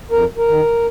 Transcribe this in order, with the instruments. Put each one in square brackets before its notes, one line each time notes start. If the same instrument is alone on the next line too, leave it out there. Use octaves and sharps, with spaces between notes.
[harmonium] F2 A#4
A#4
D#3